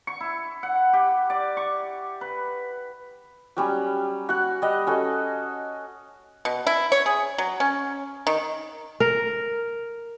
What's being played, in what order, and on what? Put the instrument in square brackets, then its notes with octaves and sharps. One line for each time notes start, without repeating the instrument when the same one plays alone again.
[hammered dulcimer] C#6
E4
F#5
G4
D5
C#6
B4
[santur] F#3 G3 C#4
F#4 F#5
G3 D#5
C#4 F#4 A4
[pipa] B2
E4
C#5
G#4
F#3
C#4
D#3
[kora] A#4